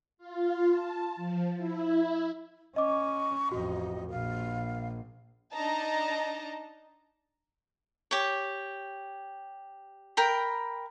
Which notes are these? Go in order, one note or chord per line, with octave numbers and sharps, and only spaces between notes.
F4
A5
F3
E4
C#4 D#5 C#6 D6
A1 F2 F#4 D#5
A#1 F5
D4 D#4 D#5 A5 A#5
G4 C#5
A#4 G5 B5